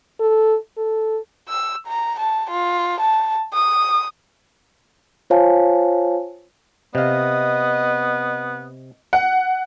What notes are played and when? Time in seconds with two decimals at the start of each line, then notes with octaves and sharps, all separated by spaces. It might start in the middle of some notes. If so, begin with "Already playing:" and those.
0.20 A4
0.77 A4
1.49 E6
1.87 A#5
2.20 A5
2.51 F4
3.01 A5
3.53 D#6
5.30 F4 C5 C#5 F5 G#5 A5
6.95 C3 B3 D#5 F5
9.13 F#5